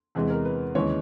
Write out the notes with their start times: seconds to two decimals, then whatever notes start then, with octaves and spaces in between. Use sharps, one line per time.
0.15 E2 C3 E3 G#3 G#4
0.30 A#4
0.45 B4
0.75 D#2 C#3 E3 G#3 C#5